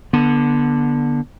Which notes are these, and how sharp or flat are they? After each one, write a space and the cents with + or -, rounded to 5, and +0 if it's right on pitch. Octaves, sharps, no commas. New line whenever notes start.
D3 +0 B3 -25